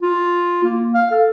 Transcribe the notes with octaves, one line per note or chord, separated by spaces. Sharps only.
F4
A#3
F5
A4